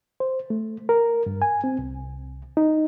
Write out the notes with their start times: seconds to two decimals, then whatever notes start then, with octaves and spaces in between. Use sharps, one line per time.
0.20 C5
0.50 A3
0.89 A#4
1.26 G2
1.42 G#5
1.64 C4
1.79 C2
2.57 D#4